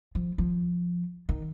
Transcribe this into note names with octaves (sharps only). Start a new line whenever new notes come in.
F3
F3
D#3